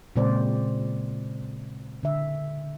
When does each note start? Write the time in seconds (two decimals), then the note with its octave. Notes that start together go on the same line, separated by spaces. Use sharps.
0.16 A#2 C#3 G#3 C4 C5 D5
2.03 D3 E5